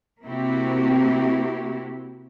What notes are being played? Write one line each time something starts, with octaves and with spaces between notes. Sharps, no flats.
C3 A#3 C4 E4 F#4 G4